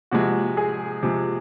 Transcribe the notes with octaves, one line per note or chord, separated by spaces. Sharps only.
C3 F3 G#3 F#4
G#4
C3 F3 G#3